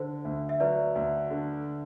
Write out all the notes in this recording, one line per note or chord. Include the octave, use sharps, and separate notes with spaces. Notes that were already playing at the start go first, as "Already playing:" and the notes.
Already playing: D3 C5
D2
E5
F#3 B4 D5
D2
D3